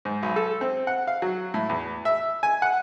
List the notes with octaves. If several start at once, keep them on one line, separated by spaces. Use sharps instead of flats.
G#2
B1
A4
C4
F#5
F5
F#3
A2
E2
E5
G#5
F#5